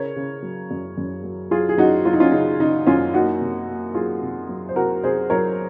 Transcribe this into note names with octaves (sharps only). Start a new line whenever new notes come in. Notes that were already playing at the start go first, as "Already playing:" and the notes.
Already playing: C#3 A#4 C#5
C#3
F#3
F#2
F#2
F#3
F#3 F4 G#4
G#4
F#2 D#4 F#4
F#3 F4
D#4
C#4 F4
C#3 D#4
C#3 D#4
F#2 C#4 F4
A#3 D#4 F#4
C3
A#3
F#3 F4 G#4
C3
F#3
C5
C3 F#4 A#4
C3 G#4 C5
F#3 A#4 C#5